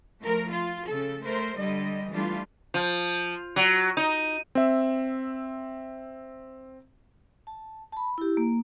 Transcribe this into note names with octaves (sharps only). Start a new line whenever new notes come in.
F3 A3 A#4
F4
C#3 A4
A3 A#4 C5
D3 G3 D#5
E3 G3 A3 D4 F4
F3
F#3
D#4
C4 E5
A5
A5 B5
E4 G4
A#3